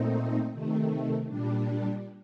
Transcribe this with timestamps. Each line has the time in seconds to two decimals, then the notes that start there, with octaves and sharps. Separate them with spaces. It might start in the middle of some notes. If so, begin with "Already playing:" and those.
Already playing: A#2 A3 C4 D#4
0.52 C3 D#3 A3
1.27 A#2 G3 D4